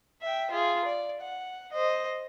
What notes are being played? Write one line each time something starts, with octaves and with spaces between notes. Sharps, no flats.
E5 G5
F4 G#4
D5
F#5
C5 D#5